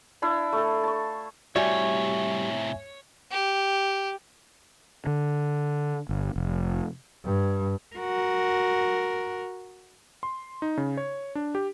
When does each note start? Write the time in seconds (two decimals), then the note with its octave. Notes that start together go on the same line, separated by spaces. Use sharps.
0.22 D4 E4 F5
0.53 A3 A4
0.83 A5 C#6
1.56 A2 C3 G3 F#4 C#5 D5 E5 G#5
3.31 G4
5.07 D3
6.09 G1
6.36 F1
7.25 G2
7.96 F#4 A#4
10.23 C6
10.62 D#4
10.77 C#3
10.97 C#5
11.35 D4
11.55 G4